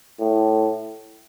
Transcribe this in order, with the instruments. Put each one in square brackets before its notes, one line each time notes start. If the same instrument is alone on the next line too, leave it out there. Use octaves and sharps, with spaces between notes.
[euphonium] A2